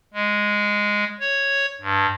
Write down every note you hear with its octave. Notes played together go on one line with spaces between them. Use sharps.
G#3
C#5
G2